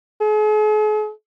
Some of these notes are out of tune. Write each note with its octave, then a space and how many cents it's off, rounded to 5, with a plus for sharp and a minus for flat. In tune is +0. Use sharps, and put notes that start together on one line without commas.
G#4 +45